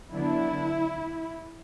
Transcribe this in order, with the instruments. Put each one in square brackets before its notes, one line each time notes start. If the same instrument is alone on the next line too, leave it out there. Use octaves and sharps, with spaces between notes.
[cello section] D3 F#3 B3 D4 E4